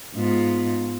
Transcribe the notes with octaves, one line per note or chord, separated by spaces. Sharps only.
G#2 B3 F4